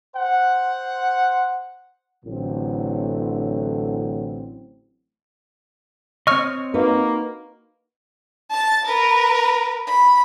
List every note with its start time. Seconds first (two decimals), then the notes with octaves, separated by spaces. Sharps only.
0.16 C5 F#5
2.25 A1 A2 D3 F#3 C4
6.27 C4 C#5 D#5 C#6 F6
6.74 A#3 D#4 F#4 B4
8.50 A5 A6
8.86 A#4 B4
9.87 B5